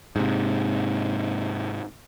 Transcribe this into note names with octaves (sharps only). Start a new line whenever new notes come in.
G#2 C3